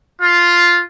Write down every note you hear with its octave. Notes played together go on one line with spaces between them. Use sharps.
F4